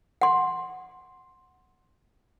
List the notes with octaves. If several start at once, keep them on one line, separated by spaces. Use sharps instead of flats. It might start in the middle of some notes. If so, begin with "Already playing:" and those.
F#5 C6